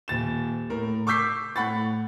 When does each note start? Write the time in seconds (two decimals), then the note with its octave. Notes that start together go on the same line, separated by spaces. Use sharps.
0.08 D#1 A6 E7
0.70 A2 A#4
1.07 C#6 D6 E6 G6 B6 C7
1.56 A2 F#5 B5 C#6 A6